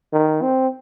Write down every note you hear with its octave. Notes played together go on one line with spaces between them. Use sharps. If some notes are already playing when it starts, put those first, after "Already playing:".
D#3
C4